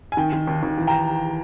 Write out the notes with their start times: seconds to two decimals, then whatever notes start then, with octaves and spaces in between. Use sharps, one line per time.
0.12 G#5
0.17 D#3 G5
0.33 D#3
0.47 D#2
0.63 D#2
0.78 E3
0.87 G5 A#5